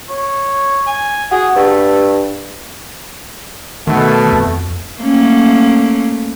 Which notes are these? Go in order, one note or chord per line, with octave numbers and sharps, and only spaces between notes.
C#5
G#5
F#4 G#4
G2 A3
B2 D#3 A3
F2
A3 A#3 C#4